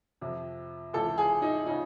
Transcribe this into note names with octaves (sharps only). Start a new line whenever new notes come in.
F2 C3 F3
C#2 C3 E3 A4
G#4
D#4
C#3 F3 D#4